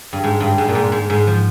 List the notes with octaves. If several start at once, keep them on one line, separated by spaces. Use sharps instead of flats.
G2
G#2
G2
G#2
A#2
G#2
G#2
G#2
F3